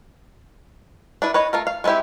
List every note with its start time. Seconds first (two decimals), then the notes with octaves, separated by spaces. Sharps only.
1.22 D4 E4 B4
1.34 B4 C#5 D#5
1.53 A3 F4 A#4
1.67 F5
1.84 G#3 B3 C4 E4 G4